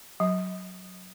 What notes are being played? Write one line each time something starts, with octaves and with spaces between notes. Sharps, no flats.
F#3